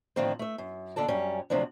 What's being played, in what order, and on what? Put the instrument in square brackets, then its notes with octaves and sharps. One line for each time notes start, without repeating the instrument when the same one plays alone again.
[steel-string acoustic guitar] A2 D3 D#3 F3 C4 C5
A3 E5
F#2
D#2 D3 D4 A4 A5
F#2 G3 C#4
D2 C3 F3 F#3 D4